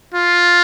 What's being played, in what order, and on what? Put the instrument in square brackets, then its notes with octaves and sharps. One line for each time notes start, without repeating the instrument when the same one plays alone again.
[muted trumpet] F4